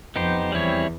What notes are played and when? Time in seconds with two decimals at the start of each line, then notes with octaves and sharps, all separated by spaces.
0.15 F2 B3 D#4 G4 C5
0.52 E2 G3 C4 E4 G#4 C#5